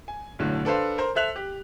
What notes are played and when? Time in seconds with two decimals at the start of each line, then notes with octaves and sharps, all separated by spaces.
0.08 G#5
0.39 B1 A2 D3
0.65 D4 A4 B4 C5 F5
0.98 A#4 C5 A#5
1.15 A4 C5 E5 F#6 F7
1.36 G4